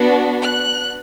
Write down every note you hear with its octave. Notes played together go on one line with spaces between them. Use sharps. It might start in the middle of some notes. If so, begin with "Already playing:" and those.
Already playing: B3 D4 F#4
F#6